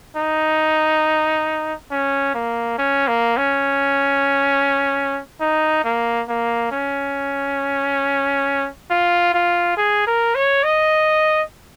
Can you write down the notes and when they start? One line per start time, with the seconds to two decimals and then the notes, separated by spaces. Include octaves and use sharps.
0.17 D#4
1.91 C#4
2.34 A#3
2.78 C#4
3.08 A#3
3.37 C#4
5.40 D#4
5.84 A#3
6.28 A#3
6.72 C#4
8.90 F4
9.34 F4
9.77 G#4
10.07 A#4
10.35 C#5
10.64 D#5